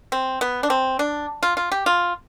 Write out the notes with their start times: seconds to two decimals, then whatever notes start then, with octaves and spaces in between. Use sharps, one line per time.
0.12 C4
0.41 B3
0.63 D4
0.70 C4
0.99 D4
1.43 F4
1.57 F4
1.72 G4
1.86 F4